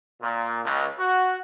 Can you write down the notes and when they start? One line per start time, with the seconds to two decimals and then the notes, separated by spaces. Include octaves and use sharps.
0.22 A#2
0.65 C#2
0.98 F#4